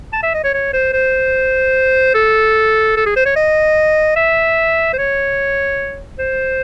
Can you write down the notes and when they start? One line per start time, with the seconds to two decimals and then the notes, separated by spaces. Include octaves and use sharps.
0.13 A5
0.23 E5
0.34 D#5
0.44 C#5
0.54 C#5
0.73 C5
0.93 C5
2.14 A4
2.96 A4
3.06 G#4
3.16 C5
3.25 C#5
3.36 D#5
4.16 E5
4.93 C5
4.98 C#5
6.19 C5